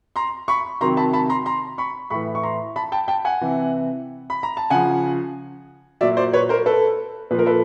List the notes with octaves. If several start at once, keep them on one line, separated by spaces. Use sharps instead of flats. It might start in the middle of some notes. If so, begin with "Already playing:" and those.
A#5 C6
B5 C#6
C3 D#3 F#3 A#5 C6
A5 B5
A5 B5
A#5 C6
A#5 C6
B5 C#6
A2 E3 B5 C#6
C#6
A#5 C6
A5 B5
G5 A5
G5 A5
F#5 G#5
C3 E3
B5
A#5
A5
C#3 F3 F#5 G#5
A#2 F#3 D5 E5
C5 D5
B4 C#5
A#4 C5
A4 B4
A#2 F3 B4
A#4
A4 B4